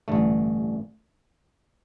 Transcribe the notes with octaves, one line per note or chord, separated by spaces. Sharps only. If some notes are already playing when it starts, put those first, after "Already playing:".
A1 G2 D3 A3